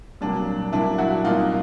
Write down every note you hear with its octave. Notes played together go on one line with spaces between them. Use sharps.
C2 A#2 F#3 A#3 D4
C2 A#2 F#3 A#3 D4 E4
E4 F#4
C2 A#2 F#3 A#3 D#4 F4